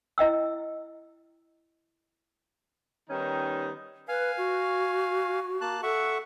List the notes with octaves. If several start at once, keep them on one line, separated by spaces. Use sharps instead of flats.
E4 D#5 G5 E6
D#3 G3 B3 C#4 D#4
B4 F5 G#5
F#4
A#3 A5 F#6
A4 E5 F#5 C#6